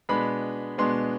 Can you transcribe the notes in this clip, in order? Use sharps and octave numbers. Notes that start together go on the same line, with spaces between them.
B2 G#3 B3 D4 B5
B2 G#3 B3 D4 C6